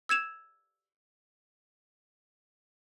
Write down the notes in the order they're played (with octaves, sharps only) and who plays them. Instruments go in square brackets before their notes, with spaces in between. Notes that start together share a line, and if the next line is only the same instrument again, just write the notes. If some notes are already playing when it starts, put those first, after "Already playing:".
[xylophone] E6 G#6 E7 F7